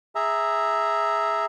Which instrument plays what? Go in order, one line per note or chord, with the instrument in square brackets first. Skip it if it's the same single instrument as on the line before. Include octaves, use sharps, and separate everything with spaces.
[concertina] G#4 E5 A#5